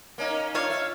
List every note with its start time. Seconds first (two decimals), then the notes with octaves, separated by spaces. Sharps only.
0.18 A#3 C#4 D#4
0.54 D4 F4 C#5 F5
0.70 E5